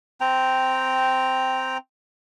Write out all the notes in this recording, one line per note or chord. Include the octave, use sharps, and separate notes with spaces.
C4 G5 A#5